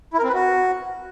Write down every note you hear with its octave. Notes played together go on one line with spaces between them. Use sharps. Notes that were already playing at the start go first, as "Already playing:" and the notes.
E4
A#4
C4
B4
F#4